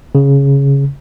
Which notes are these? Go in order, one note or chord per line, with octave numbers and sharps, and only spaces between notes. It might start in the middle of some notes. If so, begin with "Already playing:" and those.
C#3